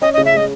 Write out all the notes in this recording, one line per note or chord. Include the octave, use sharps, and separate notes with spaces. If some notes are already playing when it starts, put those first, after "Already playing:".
C#4 D#5
D#5
C#3
E5
G#3 D#5